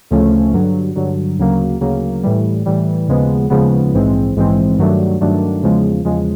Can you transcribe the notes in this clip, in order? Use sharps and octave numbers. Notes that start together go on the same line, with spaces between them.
D2 C#3 F3 A3 C#4
G2 D3 F#3
G2 D3 F#3
D2 C#3 F#3 A#3
D2 C#3 F#3 A#3
A2 E3 G3
A2 E3 G3
D#2 C#3 F3 G#3 B3
D#2 C#3 F3 G#3 B3
A#1 G#2 E3 G#3 C4
A#1 G#2 E3 G#3 C4
G2 D#3 F#3 A3 D4
G2 D#3 F#3 A3 D4
E2 C#3 F3 G#3
E2 C#3 F3 G#3